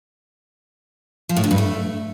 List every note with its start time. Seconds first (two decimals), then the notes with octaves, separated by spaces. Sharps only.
1.29 F3
1.36 A2
1.44 D3
1.51 G2
1.58 A3